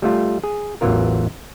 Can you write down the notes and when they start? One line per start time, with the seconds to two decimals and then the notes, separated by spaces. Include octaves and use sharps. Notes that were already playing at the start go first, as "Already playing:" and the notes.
0.02 G3 A3 F4
0.43 G#4
0.81 A1 E2 E3 F#3 F4 A#4